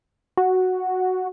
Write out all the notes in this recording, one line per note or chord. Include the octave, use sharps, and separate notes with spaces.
F#4